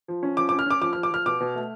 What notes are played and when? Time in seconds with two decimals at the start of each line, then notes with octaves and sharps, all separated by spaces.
0.08 F3
0.23 C#4
0.37 F3 D6
0.49 D6
0.52 C#4
0.59 F6
0.66 C#4 D6
0.81 F3 D6
0.93 F6
0.96 F3
1.03 D6
1.11 F3 F6
1.26 B2 D6
1.41 B2
1.55 A3